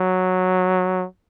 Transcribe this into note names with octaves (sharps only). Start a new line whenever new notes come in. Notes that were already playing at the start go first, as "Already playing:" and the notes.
Already playing: F#3